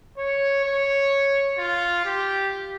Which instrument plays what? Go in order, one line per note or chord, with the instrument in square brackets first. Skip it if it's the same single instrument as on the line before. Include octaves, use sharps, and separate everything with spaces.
[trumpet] C#5
C#5
F4
G4